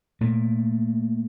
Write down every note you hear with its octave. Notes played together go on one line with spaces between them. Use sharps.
A#2 A3